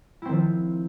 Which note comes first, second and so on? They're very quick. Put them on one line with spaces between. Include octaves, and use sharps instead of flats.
E4 C4 D#3 F3